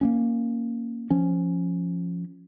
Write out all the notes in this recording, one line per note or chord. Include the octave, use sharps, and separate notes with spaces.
A#3 B3 C#4
F3 C#4